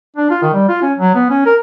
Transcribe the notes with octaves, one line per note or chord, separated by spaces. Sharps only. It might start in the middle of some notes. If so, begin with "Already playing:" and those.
D4
F4
D#3
G3
F4
C#4
F#3
B3
C#4
A#4